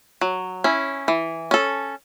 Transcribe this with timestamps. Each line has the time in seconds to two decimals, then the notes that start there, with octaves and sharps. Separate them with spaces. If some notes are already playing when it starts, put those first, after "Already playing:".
0.21 F#3
0.64 C#4 E4
1.08 E3
1.51 C#4 A4